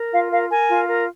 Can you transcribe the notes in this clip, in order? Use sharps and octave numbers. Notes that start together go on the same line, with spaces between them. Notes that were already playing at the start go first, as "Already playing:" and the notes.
Already playing: A#4
F4 F5
A#4 F5
A#4 G#5
F4
A#4